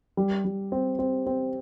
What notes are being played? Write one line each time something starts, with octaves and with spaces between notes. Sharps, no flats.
G3
G3
C4
C4
C4